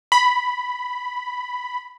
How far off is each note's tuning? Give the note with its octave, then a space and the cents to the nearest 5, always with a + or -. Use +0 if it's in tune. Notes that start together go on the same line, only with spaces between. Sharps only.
B5 +5